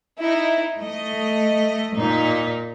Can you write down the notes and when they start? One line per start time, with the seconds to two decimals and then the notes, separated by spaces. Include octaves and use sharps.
0.20 D#4 E4
0.80 A3 D#5
1.95 A#2 D#4